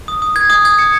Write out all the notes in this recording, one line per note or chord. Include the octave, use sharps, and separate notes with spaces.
D#6
D#6
G#6
D#6
G#6
C#7